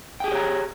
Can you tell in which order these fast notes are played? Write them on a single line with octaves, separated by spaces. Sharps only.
G5 G#4 G4 C#5 A#5